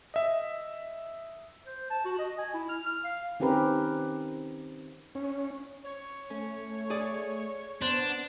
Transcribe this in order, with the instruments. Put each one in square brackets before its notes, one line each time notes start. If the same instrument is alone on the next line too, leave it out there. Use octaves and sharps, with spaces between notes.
[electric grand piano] D#5 E5
[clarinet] C5
A5
F#4
D#5
G#5
E4
F6
F6
F5
[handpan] D#3 C4 C#4 G4 A#4 B4
[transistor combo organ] C#4
[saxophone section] C#5
[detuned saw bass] A3 [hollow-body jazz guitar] C#4
[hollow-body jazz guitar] G#4 D5
[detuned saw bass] B3 [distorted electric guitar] D4 [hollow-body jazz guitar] C5